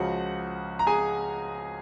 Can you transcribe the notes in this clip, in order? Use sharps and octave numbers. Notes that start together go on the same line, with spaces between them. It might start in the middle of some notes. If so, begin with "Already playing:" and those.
Already playing: C#2 C#3 F3 F#4 F#5
A#5
G#4 G#5